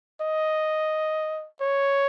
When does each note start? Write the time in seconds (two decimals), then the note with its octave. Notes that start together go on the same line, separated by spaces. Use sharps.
0.21 D#5
1.61 C#5